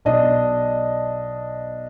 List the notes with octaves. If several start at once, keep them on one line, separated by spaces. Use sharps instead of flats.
B1 D4 D#5